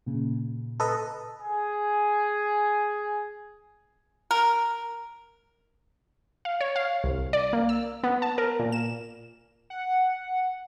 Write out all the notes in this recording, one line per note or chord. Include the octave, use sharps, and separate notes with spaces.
A#2 C#3
A4 B4 D#5
G#4 G#5
A#4
F5
C#5
F5
C2
D5
A#3
E6
B3
A5
A#4
A#2
E7
F#5